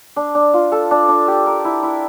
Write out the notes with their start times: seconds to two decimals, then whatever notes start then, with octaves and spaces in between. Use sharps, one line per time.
0.16 D4
0.35 D4
0.54 F4
0.72 A4
0.91 D4
1.08 D4
1.28 G4
1.46 A#4
1.65 E4
1.83 E4